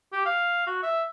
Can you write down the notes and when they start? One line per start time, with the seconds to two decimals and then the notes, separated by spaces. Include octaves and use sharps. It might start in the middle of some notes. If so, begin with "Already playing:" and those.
0.13 G4
0.25 F5
0.67 F#4
0.83 E5